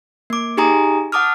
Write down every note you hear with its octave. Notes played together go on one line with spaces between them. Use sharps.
A#3 D6
D#4 G4 G#4 G#5 A#5 D#6
F#5 A5 D6 D#6 F6